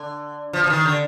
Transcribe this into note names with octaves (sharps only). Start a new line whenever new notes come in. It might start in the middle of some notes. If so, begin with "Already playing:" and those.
Already playing: D3
F3
F3
D#3
D3